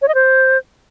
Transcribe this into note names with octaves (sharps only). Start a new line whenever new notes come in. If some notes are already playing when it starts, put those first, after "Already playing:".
C#5
D#5
C5